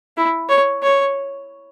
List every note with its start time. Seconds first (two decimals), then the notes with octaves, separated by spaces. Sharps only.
0.17 E4
0.49 C#5
0.83 C#5